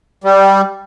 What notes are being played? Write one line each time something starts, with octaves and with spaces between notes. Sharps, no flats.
G3